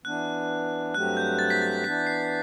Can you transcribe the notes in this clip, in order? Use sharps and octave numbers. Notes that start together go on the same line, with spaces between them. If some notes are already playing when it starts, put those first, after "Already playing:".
E3 B3 D4 F#6
G2 F#3 A3 C4 G4 F#6
G6
A6
B6
A6
E3 B3 D4 B6
C7